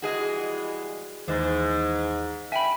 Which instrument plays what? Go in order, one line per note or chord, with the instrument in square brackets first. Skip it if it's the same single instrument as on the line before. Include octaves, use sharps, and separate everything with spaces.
[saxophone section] E3 G3 G#3 [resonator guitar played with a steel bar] F#4 G#4 D#5
[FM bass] D#2 [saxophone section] G#2 [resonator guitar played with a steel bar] E3
[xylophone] E5 B5 [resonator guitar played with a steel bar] G5 G#5